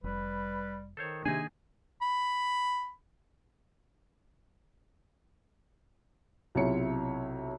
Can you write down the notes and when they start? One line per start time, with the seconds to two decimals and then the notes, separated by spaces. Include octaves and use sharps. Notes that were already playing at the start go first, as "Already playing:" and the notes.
0.04 F1 G3 B4
0.97 D#3 A4 C5 C#5
1.26 C3 D#3 A#3 D4 D#4 G#4 G#5
2.02 B5
6.55 B1 C3 E4 F4 C#5 C#7